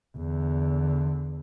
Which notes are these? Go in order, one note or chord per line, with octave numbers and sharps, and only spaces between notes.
E2 D3